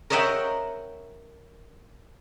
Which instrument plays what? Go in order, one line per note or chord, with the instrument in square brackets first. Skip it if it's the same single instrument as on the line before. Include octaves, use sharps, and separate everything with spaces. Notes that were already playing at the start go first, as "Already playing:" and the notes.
[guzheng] A#4 C#5 D#5 E5 F#5 G5